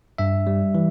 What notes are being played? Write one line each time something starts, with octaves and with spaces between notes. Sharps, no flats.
G2 E5
G3
E3